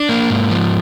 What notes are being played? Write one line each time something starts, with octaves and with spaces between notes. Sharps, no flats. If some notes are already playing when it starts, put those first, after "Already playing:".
Already playing: D4 D5
A#3
G#2
F3